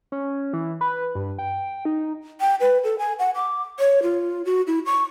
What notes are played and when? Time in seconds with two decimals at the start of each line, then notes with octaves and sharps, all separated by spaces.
0.12 C#4
0.53 E3
0.81 B4
1.15 G2
1.39 G5
1.85 D#4
2.41 G5
2.61 B4
2.84 A4
2.99 G#5
3.19 F#5
3.35 D6
3.80 C#5
4.03 F4
4.45 F#4
4.67 E4
4.86 C#6